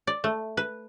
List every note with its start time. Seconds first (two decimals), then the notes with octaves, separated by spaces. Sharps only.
0.07 D5
0.24 A3
0.57 B4